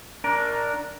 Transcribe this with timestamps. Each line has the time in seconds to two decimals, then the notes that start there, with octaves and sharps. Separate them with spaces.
0.24 D4 A#4